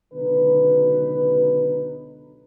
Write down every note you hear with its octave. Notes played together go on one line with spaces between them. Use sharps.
C#2 B2 D3 F#3 D#4 B4